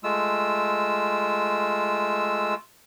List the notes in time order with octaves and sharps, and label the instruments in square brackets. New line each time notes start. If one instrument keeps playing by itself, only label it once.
[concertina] G#3 A3 F4 E6